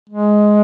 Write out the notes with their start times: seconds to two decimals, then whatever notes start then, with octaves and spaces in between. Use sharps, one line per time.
0.10 G#3